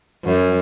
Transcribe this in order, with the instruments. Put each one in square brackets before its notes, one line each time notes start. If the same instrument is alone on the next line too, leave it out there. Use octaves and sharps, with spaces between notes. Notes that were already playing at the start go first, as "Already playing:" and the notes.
[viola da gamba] F#2